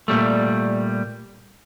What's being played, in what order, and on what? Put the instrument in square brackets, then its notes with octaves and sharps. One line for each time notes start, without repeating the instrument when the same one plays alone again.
[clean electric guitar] A#2 G3 A3